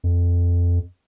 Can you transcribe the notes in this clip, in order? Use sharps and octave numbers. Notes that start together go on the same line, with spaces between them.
F2